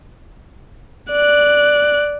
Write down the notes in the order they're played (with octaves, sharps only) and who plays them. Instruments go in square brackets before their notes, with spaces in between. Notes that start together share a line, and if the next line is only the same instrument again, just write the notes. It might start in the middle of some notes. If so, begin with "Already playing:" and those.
[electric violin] D5 F#6